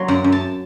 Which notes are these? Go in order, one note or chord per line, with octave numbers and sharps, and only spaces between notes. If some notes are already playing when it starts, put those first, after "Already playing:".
Already playing: F#3 A#3 C6
F#2 F#5
F#2
A5